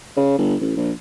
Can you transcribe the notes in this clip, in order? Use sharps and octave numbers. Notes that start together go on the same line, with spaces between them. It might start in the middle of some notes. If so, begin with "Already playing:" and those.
C#3
G1
A1
A#1